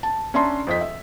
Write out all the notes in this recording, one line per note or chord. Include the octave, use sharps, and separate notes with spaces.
A5
C#4 D4 E5 A5 A#5 C6
F2 C5 D#5 B6
E5